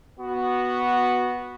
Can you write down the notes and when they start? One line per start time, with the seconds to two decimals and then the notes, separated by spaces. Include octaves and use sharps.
0.20 B3 F#4